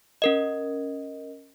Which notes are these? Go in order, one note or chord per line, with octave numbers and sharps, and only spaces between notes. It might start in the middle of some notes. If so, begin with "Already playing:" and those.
C#4 A#4 D#5